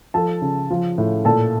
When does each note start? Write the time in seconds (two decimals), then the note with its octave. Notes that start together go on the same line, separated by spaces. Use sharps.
0.14 F3 A4 A5
0.42 C#3
0.70 F3
0.98 A2
1.25 A#2 A4 A5